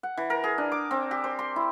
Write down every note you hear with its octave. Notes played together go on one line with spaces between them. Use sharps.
F#5
E3
A#4
G#4
D4
D6
C4
G4
C5
C6
E4